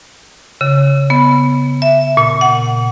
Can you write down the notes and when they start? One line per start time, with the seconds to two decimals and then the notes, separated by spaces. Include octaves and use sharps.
0.61 C#3
1.10 B3
1.82 E5
2.17 A#2
2.41 F#5